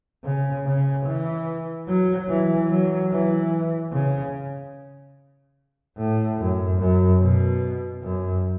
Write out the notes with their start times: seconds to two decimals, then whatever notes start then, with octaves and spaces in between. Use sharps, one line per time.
0.24 C#3
0.66 C#3
1.06 E3
1.88 F#3
2.29 E3
2.70 F#3
3.11 E3
3.93 C#3
5.97 A2
6.39 F#2
6.79 F#2
7.20 B2
8.02 F#2